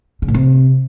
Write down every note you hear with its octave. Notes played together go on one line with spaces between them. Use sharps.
C#3
A2
C3